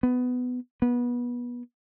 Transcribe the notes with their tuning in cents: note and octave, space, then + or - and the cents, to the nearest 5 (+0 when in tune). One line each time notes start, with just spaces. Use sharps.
B3 +15
B3 -25